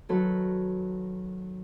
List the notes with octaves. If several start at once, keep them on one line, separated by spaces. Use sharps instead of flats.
D#3 F#3 A4 B4